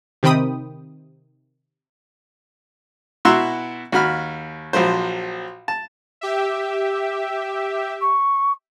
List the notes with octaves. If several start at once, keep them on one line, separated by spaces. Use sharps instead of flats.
C3 D#3 C4 G5 B5 D#6
B2 E4 F#4 A#5 C6 E6
D#2 F#4 B5 F6
A#1 F3 F#3 C5
A5
G4 E5
C#6